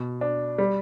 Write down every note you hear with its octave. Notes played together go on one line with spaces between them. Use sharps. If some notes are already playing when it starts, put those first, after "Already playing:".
Already playing: B2
D4
G3